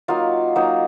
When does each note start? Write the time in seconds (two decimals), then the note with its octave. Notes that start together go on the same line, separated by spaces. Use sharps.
0.08 F#3 A#3 D#4 F4 F5
0.56 F#3 A#3 D#4